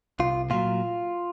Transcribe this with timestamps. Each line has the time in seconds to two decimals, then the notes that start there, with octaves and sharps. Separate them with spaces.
0.20 C2 F4
0.50 A#2 F#3 F4